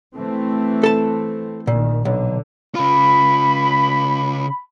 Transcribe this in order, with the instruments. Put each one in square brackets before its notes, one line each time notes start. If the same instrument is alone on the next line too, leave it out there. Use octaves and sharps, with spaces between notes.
[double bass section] E3 A3 C4
[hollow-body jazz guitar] A4 A5
[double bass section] A#1 D#3 [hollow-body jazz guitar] A#2
[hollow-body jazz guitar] B1 [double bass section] D3
[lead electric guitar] C#3 F4 [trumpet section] B5